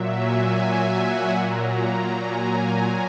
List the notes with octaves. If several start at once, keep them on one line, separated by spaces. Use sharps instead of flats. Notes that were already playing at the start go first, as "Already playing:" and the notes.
Already playing: A#2 F#3 E5
G#5
E5
F#5
A#2 F#3 A#5
G#5